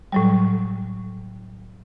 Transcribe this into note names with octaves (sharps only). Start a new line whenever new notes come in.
A2 F#3 G3